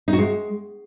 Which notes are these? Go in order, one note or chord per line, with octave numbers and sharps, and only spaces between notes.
D#4
F#4
G#3